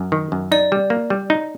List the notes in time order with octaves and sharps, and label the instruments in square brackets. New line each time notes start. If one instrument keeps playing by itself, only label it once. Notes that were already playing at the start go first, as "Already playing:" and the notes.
Already playing: [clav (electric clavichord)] F#2
D#3
F#2
[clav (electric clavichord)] D#4 [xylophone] D5
[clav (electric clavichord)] G3
A#3
G3
D#4